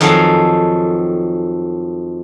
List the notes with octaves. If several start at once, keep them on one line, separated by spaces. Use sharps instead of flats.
F2 D#3 F#3 G#4 A4 F5